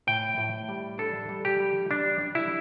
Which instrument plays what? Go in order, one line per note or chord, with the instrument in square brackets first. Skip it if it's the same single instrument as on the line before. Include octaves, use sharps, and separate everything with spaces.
[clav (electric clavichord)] A2 G5
A2
G3
D4 A4
G3
G4
G3
G3 D4
D4
E4